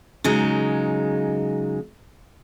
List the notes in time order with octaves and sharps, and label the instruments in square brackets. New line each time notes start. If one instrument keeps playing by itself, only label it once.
[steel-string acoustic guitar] C#3 F#3 G#3 D#4